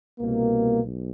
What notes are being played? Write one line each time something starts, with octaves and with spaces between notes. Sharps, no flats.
C2 B2 A#3
B1